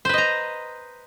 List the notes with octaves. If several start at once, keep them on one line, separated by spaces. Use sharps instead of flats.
B4 C5 D#5 A#5